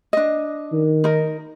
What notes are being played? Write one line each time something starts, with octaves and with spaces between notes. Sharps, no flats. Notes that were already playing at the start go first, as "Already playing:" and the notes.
D4 D#5
D#3
D#4 A#4